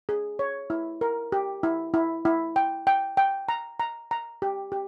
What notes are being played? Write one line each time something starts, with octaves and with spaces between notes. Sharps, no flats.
G#4
C#5
E4
A#4
G4
E4
E4
E4
G5
G5
G5
A#5
A#5
A#5
G4
G4